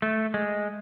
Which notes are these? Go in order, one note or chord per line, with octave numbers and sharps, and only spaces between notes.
A3
G#3